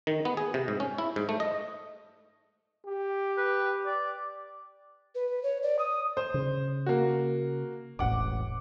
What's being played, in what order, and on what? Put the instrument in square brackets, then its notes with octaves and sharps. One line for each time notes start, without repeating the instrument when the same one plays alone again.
[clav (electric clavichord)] D#3
B3
G#4
C3
G#2
C#4
E4
G#2
A3
D#5
[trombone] G4
[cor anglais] B4
D5
[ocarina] B4
C#5
D5
D#6
[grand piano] C5
[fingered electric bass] C#3
[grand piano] A#3 F#4
[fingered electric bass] E1 A1 [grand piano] F#5 D6